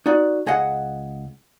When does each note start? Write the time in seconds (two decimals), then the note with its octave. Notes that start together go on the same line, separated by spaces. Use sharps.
0.06 D#4 F#4 D5
0.46 C#2 G#4 D#5 F#5